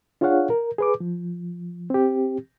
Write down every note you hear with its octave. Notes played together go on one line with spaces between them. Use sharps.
D4 F4 G#4 C#5 F5 F#5
A#4
G#4 B4 D6
F3
C4 G4